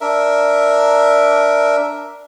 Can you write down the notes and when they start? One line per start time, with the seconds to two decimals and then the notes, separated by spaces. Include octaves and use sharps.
0.01 D4 A#4 E5